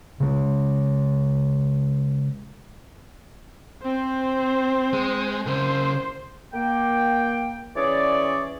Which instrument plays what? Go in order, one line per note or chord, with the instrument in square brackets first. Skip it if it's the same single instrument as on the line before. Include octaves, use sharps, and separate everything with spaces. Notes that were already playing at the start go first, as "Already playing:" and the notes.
[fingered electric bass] C#3 G#3
[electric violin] C4 C5
[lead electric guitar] G#3
[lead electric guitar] C#3 A#4 [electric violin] C5
[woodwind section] A#3 G5
E3 C#4 G#4 C#5 D5